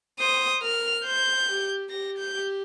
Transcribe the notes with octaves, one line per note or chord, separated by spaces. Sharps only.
C5 D#6
A#4 F6
C5 G6
G4
G4 A#6
G6
G4